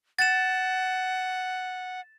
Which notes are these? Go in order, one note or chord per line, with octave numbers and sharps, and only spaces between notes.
F#5 A6 E7